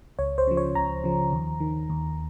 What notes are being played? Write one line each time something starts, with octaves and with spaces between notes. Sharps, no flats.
C#2 C#5
C5
C#3 F3
C#5
C#2 A#5
C#3 F3
D#2
D#3
D#2